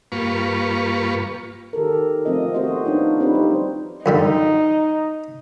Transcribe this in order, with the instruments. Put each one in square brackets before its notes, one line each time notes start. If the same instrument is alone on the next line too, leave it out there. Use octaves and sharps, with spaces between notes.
[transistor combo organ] G2 A#3 F4 B4 C#6
[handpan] D#3 G4 A4 A#4
F3 A3 C4 F4 D#5
F3 B3 F#4 G4 C5 D#5
D4 D#4 F4 C#5
C4 D4 D#4 F4 G4 B4
G3 C5
[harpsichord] F#2 D3 G3 [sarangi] D#4